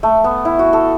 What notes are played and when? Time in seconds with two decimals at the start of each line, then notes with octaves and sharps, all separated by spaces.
0.03 A3
0.24 B3
0.45 E4
0.59 F#4
0.73 A4